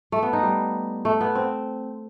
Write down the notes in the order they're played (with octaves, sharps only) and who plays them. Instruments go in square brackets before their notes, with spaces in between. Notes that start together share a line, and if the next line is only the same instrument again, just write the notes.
[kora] A3
B3
D#4
G3
A3
B3
C4